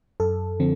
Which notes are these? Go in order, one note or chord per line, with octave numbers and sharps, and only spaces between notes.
F#2 A4
D3 F3 C4